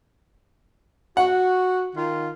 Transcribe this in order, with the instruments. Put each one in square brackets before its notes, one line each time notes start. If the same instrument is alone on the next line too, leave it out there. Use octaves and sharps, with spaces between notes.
[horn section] F#4 [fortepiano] F#5
[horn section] D#3 F4